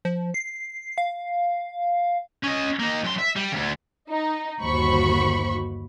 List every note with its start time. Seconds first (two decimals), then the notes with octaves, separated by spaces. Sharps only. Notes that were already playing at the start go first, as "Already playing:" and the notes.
0.05 F3
0.34 C7
0.98 F5
2.44 C#4 D#5
2.80 A#3 D#4
3.05 F#2 C6
3.19 E5
3.36 G3
3.52 D2 C#3
4.10 D#4
4.62 G1 D#2 F#4 C5 B5 C#6